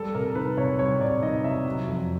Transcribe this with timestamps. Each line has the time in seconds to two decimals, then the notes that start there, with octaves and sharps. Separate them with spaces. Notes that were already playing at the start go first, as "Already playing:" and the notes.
Already playing: G3 A4
0.14 C3 A#4
0.35 D#3 B4
0.57 C3 C#5
0.79 G3 C#5
1.01 C3 D5
1.22 D#3 D#5
1.44 C3 E5
1.65 F#3
1.87 F2